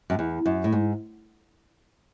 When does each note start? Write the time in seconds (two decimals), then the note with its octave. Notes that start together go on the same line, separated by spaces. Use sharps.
0.10 F#2
0.19 E2
0.46 F#2
0.64 A2
0.73 G#2